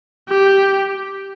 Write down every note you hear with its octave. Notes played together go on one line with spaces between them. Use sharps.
G4